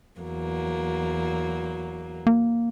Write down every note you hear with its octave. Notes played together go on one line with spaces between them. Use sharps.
E2 F#3 A#3
A#3